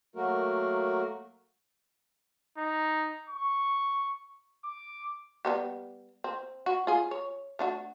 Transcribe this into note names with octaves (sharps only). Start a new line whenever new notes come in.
F#3 A3 A#3 F#4 A#4
D#4
C#6
D6
G3 B3 G4
C4
F#4
F4 G#4
C#5
A3 D4 F#4